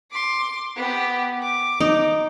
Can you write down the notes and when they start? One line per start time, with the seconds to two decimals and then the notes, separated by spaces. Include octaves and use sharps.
0.12 C6 D6
0.76 B3 G4
1.43 D6
1.80 D#4